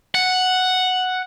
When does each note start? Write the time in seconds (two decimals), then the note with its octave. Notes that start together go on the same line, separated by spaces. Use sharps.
0.15 F#5